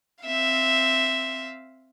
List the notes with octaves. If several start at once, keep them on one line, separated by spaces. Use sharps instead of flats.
C4 E5 F5